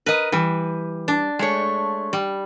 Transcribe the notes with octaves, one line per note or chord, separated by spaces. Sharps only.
A#4 B4 D#5
E3 G3
D4
G#3 A3 C#5
G3